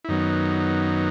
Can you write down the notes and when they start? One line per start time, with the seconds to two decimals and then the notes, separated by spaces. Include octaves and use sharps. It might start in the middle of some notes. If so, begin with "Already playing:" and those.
0.05 E4
0.08 F#2 D#3 F#3 B3 D#4